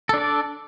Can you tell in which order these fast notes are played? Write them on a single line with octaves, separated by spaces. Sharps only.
A4 D4 D5